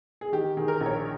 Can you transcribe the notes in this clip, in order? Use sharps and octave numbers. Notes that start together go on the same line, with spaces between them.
G#4
D#3 G4
D#3 G#4
A#4
A#1
C#5